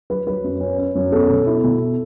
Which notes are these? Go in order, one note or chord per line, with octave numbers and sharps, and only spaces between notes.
F#3 B4
F#3 B4
F#2
C#4
C#4
F#2
B3 A4
B2
E4
B2